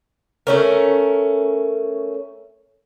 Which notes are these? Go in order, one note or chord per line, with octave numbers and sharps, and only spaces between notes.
A3 C#4 A#4